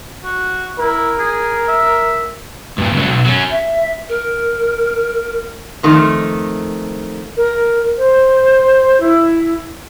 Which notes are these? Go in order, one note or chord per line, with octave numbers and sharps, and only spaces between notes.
F#4
E4 A#4
G#4
E5
G2 A#2
C#2 F#3
B1
F#3 C#4
E5
A#4
F2 D#3 A3
A#4
C5
E4